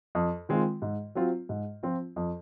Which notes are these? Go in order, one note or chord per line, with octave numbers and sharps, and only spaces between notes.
F2
D#3 G#3 C4 F4
G#2
F#3 C4 F4
G#2
F3 C4 F4
F2